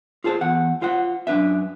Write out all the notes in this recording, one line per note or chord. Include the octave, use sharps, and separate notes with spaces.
F4 G#4 A4 C5
E2 F#5
F4 C5 F#5
F#2 D4 B4 E5